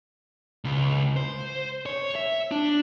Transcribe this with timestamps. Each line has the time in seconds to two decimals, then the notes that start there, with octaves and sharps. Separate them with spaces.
0.65 C#2
1.16 C5
1.86 C#5
2.16 E5
2.51 D4